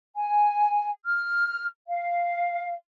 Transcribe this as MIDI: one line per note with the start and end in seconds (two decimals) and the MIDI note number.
0.16 0.89 80
1.05 1.65 89
1.87 2.72 77